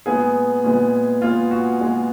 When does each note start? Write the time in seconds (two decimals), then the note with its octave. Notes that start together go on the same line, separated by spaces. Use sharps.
0.06 A#2 G#3 B3 G#4
0.64 A#2 G#3 B3
1.22 A#2 G#3 B3 F4
1.51 F#4
1.80 A#2 G#3 B3